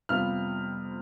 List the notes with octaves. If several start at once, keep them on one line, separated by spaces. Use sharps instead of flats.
F2 C3 G3 B3 F4 F6